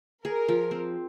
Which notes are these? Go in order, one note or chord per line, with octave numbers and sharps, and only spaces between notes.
G#4 A#4
F3
C4